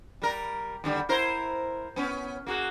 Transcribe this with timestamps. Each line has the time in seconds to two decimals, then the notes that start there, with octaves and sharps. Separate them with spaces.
0.22 G3 A#4
0.84 D#2 D3 G3
1.09 E4 A#4 C5
1.96 B3 C#4
2.47 A#3 F#4 G#4